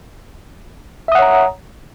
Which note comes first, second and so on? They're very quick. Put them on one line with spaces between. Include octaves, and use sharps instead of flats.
E5 D#6 F#5 C#5 A#5